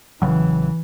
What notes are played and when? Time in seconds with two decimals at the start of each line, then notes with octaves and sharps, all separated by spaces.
0.22 A1 C#3 E3 F#3